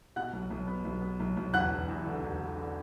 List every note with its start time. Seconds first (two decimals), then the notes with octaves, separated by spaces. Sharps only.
0.16 B2 F#5 F#6
0.33 B1
0.50 B1
0.67 B3
0.85 B1
1.01 B3
1.20 B1
1.37 B1
1.53 E1 F#5 F#6
1.70 E1
1.88 E2
2.06 D3
2.22 E1
2.40 D3
2.57 D3